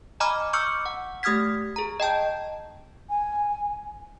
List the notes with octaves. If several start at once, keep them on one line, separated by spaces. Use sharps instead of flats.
D#5 G#5 A#5 B5 D6 F6
C#6 D6 E6 F6 G6 C#7
F#5
A3 G4 D#6 F6 G#6 B6
G#4 A#5
D#5 G5 A5 G6
G#5